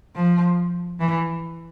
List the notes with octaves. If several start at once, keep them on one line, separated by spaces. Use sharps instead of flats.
F3
E3